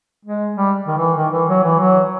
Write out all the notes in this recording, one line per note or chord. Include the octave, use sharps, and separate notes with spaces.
G#3
G3
D#3
E3
D#3
E3
F#3
E3
F#3